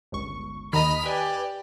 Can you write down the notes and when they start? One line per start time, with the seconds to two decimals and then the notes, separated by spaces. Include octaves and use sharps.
0.12 G1 C#2 C#6
0.73 D#2 D#3 D#5 A#5 B5 D#6 F6 B6
1.05 G4 B4 D5 G#5